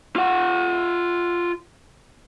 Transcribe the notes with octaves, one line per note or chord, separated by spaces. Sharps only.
F4 F#5